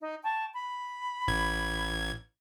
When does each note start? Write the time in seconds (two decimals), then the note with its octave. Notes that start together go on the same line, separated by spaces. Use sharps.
0.01 D#4
0.23 G5 A5 C#6
0.52 B5
1.28 A1 G#6